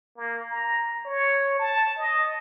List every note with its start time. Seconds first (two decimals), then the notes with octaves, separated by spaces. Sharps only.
0.17 A#3
0.50 A#5
1.05 C#5
1.59 A5
1.98 D#5